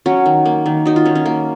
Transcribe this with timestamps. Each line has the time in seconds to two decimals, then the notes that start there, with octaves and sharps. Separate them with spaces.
0.06 F#3 C#4
0.26 D#3
0.46 A#3
0.66 D#3
0.86 F#3 D#4
0.96 F4
1.05 D#3 C#4
1.15 C#4
1.26 A#3